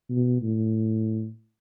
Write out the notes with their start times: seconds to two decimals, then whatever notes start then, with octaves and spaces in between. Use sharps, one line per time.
0.10 B2
0.42 A2